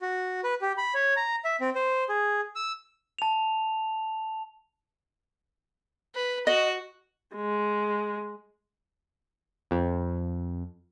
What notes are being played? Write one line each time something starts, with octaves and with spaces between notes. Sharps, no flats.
F#4
B4
G4
B5
C#5
A#5
E5
C4
C5
G#4
E6
A5 F7
B4
F#4 D#5
G#3
F2